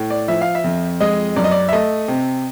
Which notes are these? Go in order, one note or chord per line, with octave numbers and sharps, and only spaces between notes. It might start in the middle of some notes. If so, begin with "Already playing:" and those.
Already playing: A2
D5
F3 E5
F5
E5
F2
G#3 D#5
F#2 D5
D#5
D5
E5
A3 D#5
C3